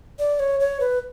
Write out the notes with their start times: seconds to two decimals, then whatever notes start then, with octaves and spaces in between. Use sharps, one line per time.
0.19 D5
0.40 C#5
0.60 C#5
0.80 B4